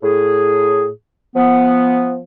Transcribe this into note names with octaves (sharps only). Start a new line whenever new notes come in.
A2 G#4
F3 B3